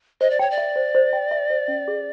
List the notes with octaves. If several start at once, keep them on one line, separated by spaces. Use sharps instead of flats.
C5 D#5
D5
C#5 G5
D5
E5
C5
C5
G5
E5
C5
C#4
G#4